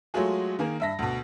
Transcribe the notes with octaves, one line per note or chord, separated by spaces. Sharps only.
F#3 G#3 A3 F4 F#4 G#4
D#3 A#3 G#4 A#4
G2 E5 A#6
D2 B2